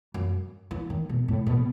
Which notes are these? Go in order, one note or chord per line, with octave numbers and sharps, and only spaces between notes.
F#2
E3
D#3
B2
A2
B2